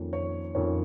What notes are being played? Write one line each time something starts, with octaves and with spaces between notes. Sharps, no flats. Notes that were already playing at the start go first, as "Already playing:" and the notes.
Already playing: F2 D#3 A#3 C#4
C#5
F2 D#3 A#3 C#4 C#5